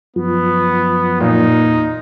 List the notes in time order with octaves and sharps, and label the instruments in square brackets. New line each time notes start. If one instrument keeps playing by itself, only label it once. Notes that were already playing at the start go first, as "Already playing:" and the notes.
[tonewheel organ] F#2 F3 [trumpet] B3
[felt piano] A#2 [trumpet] D#4
[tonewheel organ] E2